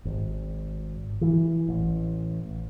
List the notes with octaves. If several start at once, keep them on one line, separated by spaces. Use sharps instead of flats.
G#1
E3
A1